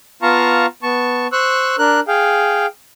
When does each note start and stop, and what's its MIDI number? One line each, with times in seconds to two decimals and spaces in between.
0.22 0.66 59
0.22 0.66 65
0.22 0.66 77
0.22 0.66 81
0.22 0.66 82
0.22 0.66 85
0.83 1.27 59
0.83 1.27 81
0.83 1.27 85
1.32 1.76 72
1.32 1.76 85
1.32 1.76 88
1.32 1.76 90
1.78 2.00 62
1.78 2.00 70
1.78 2.00 90
2.08 2.66 68
2.08 2.66 77
2.08 2.66 79